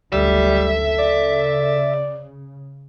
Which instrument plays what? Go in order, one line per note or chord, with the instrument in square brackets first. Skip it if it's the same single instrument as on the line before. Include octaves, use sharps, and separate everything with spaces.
[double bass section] F#1 D2 [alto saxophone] G3 [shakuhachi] A4 [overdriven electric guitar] E5
[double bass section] C#3 [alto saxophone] D5